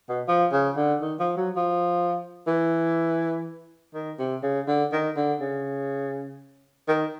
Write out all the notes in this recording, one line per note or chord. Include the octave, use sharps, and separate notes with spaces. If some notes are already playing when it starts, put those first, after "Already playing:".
B2
F3
C#3
D3
D#3
F3
F#3
F3
E3
D#3
C3
C#3
D3
D#3
D3
C#3
D#3